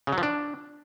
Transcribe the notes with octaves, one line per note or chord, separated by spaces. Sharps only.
C#3
F#3
F3
D4